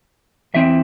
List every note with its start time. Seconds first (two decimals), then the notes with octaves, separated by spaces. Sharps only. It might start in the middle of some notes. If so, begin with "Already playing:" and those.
0.54 E2 E3 C4 E4 E5